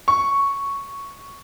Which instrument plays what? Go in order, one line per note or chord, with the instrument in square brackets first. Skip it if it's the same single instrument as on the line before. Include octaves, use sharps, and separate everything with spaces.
[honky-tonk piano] C#6